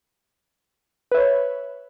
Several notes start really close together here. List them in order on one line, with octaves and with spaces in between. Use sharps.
B4 E5 C#5